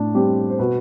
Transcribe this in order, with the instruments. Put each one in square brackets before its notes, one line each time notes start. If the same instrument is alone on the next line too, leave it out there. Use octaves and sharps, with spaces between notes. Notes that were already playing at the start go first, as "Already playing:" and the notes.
Already playing: [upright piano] A2 D4
G3 C4 G4
C5
B2 B4